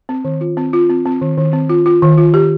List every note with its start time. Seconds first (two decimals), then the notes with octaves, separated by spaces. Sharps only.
0.09 C4
0.25 D#3
0.41 F4
0.57 C4
0.73 F4
0.90 C4
1.05 C4
1.21 D#3
1.38 D#3
1.53 C4
1.69 F4
1.86 F4
2.02 D#3
2.18 F4
2.34 G4